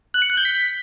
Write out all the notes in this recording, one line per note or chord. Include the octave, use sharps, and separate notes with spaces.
F#6
C#7
F#6
G6
B6